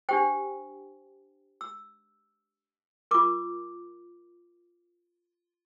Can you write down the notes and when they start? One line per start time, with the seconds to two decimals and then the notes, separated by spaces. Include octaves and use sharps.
0.09 D4 G4 C5 G5
1.61 E6
3.11 F4 A#4 D6